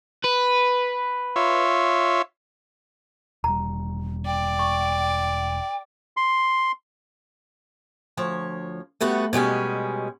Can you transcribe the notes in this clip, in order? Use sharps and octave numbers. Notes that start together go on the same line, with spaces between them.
B4
F4 C#5 E5
E1 G3 A#5
D5 G5
C#6
C6
D2 F3 C#5
G3 A3 B3 F#4
B2 G3 G#3 C#4